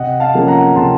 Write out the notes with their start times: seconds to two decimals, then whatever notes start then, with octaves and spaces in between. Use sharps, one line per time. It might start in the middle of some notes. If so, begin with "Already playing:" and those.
Already playing: C3 D#5 F#5
0.20 F5 A5
0.34 F3 A#3 C#4
0.47 F#5 A#5
0.75 C3 A5 C6